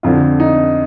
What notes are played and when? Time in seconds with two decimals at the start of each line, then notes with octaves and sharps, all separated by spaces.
0.03 F2 D3 F4
0.40 D#4